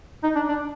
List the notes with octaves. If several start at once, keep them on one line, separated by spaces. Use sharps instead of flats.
D#4
D4
D4